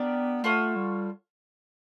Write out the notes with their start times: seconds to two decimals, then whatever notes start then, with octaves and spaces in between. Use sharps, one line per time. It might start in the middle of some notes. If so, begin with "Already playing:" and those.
Already playing: B3 D4 G4 A#4 D5
0.44 A3 F4 A4 C#5 F#5
0.76 G3